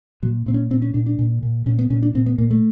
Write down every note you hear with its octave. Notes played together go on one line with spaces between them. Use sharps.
A#2 F#3
A#2 C4
C#4
A#2 C4
C#4
A#2 D4
D4
A#2
A#2
A#2 C#4
B3
A#2 C#4
D4
A#2 C4
B3
A#2 A#3
A3